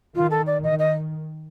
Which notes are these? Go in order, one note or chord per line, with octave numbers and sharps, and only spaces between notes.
D#3 F4
A4
D5
D#3 D#5
D#5